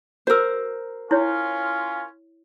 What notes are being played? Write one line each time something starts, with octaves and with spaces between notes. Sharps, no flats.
F#4 A#4 C5 E6
C#4 E4 F4 C#5